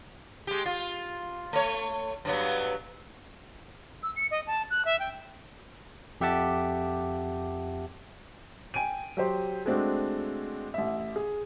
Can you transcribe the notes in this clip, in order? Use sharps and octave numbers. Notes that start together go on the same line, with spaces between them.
G#3 G4
F4
A3 C#5
G2 F#3 B3
E6
C#7
D#5
A5
F#6
E5
G5
F2 G4 E5 F#5 A5 D6
G5 G#5 D7 D#7
F#3 G4 C5
G#3 A3 C4 D4 F#4
A1 E5
G#4